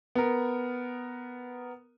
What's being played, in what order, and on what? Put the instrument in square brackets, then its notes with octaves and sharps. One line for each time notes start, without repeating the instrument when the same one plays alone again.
[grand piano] B3 A#4